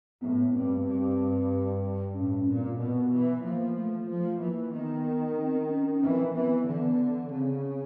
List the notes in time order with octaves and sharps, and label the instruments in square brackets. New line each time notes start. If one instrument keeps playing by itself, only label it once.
[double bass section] A2 [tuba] B3
[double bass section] G2 [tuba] C4
[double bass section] G2
[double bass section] A2 [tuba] C#4
[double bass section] A#2 [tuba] C4
[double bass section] B2 [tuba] B3
[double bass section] E3
[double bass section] F3 [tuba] A#3
[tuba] A3
[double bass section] F3
[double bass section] E3 [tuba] A#3
[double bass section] D#3 [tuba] B3
[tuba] C4
C#4
[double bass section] E3 [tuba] C4
[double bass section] E3 [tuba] B3
[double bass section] D3 [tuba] B3
[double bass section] C#3 [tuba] C4